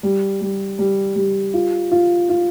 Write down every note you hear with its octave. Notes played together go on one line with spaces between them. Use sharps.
G3
G3
G3
G3
F4
F4
F4